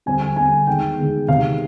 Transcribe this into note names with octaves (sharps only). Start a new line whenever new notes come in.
D3 G3 C4 G#5
G#5
D3 G3 C4 G#5
D#3 G#3 B3 G5
D#3 G#3 B3
C3 D#3 G#3 B3 F5